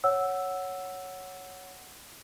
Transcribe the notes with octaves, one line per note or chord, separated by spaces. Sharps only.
C#5 F#5 E6